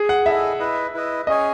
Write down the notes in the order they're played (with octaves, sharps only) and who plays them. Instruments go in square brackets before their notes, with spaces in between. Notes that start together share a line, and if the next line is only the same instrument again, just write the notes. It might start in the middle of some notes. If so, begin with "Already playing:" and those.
Already playing: [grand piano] G#4
F#5
[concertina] E4 A4 D#5 G#5 [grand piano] E5
[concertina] E4 B4 D#5
E4 B4 D#5
[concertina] C#4 G#4 C#5 G#5 [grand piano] D#5